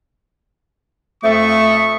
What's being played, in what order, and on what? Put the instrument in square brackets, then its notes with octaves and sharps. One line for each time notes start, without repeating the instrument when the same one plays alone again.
[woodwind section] F2 D#6 [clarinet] A3 [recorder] E5 [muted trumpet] C#6